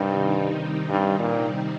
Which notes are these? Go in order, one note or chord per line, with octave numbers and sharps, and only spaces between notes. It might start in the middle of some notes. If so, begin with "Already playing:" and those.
Already playing: G2 C3 D#3 G3 C4 D#4
G2
A#2